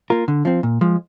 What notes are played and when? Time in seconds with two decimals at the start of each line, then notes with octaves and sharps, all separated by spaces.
0.10 A#3 F4 A#4
0.28 D3
0.45 F3 C4
0.63 A#2
0.81 F3 G#3